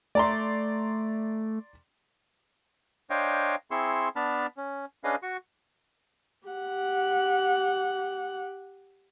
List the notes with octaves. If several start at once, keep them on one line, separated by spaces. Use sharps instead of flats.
A3 D5 A#5 C6
D4 C5 C#5 D#5 F5 G5
C4 E4 G#4 C6 C#6 E6
B3 D4 A5 B5 F6
C#4
C#4 D4 G#4 B4 D#5 F5
F#4 C#6
G4 F#5